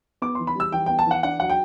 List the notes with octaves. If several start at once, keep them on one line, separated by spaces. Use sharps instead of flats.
B3 D6
E3 C6
B5
G3 E6
E3 G5
B3 G5
A5
E3 F#5
D4 F#5
F#3 F#5
G5